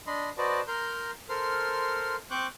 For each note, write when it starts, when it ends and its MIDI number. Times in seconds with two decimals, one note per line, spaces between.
0.07 0.29 62
0.07 0.29 75
0.07 0.29 83
0.07 0.29 84
0.38 0.61 66
0.38 0.61 71
0.38 0.61 72
0.38 0.61 74
0.38 0.61 75
0.38 0.61 81
0.68 1.11 70
0.68 1.11 82
0.68 1.11 84
0.68 1.11 91
1.29 2.16 69
1.29 2.16 70
1.29 2.16 72
1.29 2.16 84
1.29 2.16 89
2.31 2.47 60
2.31 2.47 72
2.31 2.47 85
2.31 2.47 86
2.31 2.47 90
2.31 2.47 91